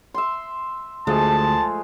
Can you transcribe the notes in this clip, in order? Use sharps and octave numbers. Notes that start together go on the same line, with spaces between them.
E5 C6
D2 F3 G#3 A3 A5